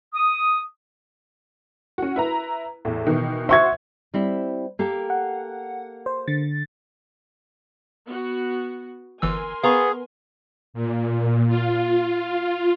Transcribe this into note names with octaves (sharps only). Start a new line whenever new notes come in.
D#6
C#4 F#4
E4 B4 A#5
E2 A2
B2 D#3 E3
F#4 C5 E5 C#6 G#6
G3 C4 E4
A#3 G4 A4
F#5
C5
D3 A6
B3 F#4
G1 E3 A#4 G#5 C6 E6
B3 G#4 F5 A#5 C#6
A#2
F4